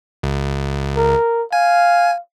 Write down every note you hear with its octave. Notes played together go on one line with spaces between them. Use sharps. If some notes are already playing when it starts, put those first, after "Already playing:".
C#2
A#4
F5 G#5